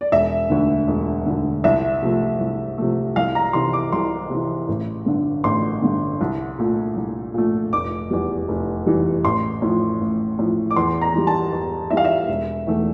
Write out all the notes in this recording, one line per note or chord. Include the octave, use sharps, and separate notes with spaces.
D5
E1 E5
D2 D3
E1
D2 D3
C2 E5
C3 F3 A3
C2
C3 F3 A3
C2 F5
A#5
C3 E3 C6
D6
C2 C6
C3 E3
A1
G2 D3
A1 C6
G2 D3
C2
A#2 A3
C2
A#2 A3
F1 D6
E2 E3 G3
F1
E2 E3 G3
A1 C6
A2 F3
A1
A2 F3
D6
E2 C6
A#5
E3 G3
A5
E2
E3 G3 E5 F5
E5
E1
E2 E3 A3